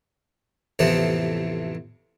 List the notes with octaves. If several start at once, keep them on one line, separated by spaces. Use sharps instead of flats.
A1 F2 C3 E3 B3 A5